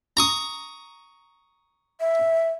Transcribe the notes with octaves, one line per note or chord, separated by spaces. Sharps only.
A#5 C#6 D#6
E5